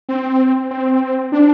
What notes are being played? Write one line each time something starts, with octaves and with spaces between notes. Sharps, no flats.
C4
C4
D4